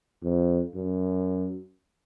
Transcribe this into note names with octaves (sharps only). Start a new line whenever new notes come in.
F2
F#2